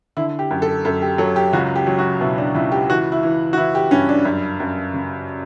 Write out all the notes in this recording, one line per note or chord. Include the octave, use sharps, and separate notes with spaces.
D3 E4
G4
F#2
A4
F#2 A4
G4
F#3 A4
G4
C#2 F#4
G4
F#3
F#4
B2 E4
D4
C#2 E4
G4
E3 F#4
E4
E3
F#4
E3 E4
G4
G2 C#4
D4
F#2
F#2
C#3